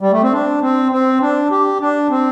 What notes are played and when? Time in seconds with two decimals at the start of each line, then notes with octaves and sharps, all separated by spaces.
0.01 G3
0.12 A3
0.23 C4
0.33 D4
0.62 C4
0.92 C4
1.21 D4
1.51 G4
1.81 D4
2.10 C4